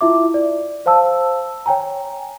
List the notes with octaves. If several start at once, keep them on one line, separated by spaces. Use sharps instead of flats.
E4 F4 E5 D6
D5
C5 F5 A5 E6
C#5 G5 G#5 A#5